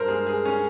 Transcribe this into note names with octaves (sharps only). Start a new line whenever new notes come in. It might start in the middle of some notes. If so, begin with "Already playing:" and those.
Already playing: G2 A#4 C5
G#3 G#4
G#4
C#4